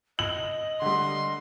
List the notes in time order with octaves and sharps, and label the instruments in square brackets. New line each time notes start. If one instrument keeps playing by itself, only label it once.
[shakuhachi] D#5 [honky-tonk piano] F#7
[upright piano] D3 G3 [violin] C6